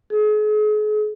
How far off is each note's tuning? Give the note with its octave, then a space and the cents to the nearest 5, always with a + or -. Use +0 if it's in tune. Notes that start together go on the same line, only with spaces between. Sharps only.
G#4 +40